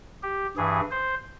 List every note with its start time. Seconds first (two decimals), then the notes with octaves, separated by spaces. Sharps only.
0.23 G4
0.57 G2 E3 G#4
0.91 C5